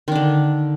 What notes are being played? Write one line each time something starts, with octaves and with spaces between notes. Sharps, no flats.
D3 D#3 D4